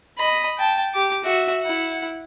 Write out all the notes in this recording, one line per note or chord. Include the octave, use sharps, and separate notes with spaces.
D#5 B5
G5 A5
G4 D6
F#4 E5
E4 F#5